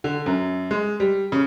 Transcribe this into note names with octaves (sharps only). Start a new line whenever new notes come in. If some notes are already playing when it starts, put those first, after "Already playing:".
D3
F#2
G#3
G3
C#3